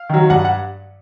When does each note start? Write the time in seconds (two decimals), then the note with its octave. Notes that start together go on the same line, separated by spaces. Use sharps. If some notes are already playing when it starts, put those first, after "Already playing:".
Already playing: F5
0.10 D#3 F#3
0.30 G2 F#5
0.45 F#5